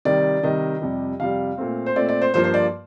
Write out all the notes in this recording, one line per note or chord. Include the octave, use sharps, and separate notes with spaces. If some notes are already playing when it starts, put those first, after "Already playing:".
C3 D#3 G3 D5
C3 D#3 G3 D#5
F2 C3 G3
F2 C3 G3 F5
A#2 A3 C4
C5
A#2 A3 C4 D5
D5
C5
G2 F3 A#3 C5
C5
D5